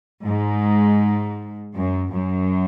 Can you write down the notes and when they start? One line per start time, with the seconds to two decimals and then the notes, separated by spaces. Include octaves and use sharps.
0.24 G#2
1.74 F#2
2.11 F#2